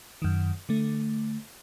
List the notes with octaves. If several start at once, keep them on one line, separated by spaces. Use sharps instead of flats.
F#2 D#3
D3 A3